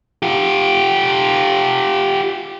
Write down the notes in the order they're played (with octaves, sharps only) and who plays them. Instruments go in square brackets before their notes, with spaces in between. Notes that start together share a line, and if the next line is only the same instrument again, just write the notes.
[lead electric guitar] F4 G4